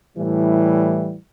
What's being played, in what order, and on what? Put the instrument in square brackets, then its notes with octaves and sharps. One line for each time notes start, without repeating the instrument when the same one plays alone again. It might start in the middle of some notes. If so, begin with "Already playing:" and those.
[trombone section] A2 E3 G3